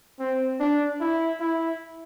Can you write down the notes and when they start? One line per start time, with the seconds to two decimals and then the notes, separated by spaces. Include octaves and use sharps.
0.20 C4
0.60 D4
1.00 E4
1.40 E4